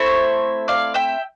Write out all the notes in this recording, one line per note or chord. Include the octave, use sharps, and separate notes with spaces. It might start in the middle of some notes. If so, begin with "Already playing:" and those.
Already playing: A3 C4 E4 C5 E5
D5 F5
E5 G5